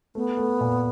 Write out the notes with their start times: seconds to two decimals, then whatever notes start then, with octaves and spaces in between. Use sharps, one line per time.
0.15 A3 B3
0.37 A3
0.60 A#2